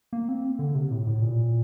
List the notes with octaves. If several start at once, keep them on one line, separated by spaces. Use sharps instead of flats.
A#3
C4
D3
C3
A2
A2
A#2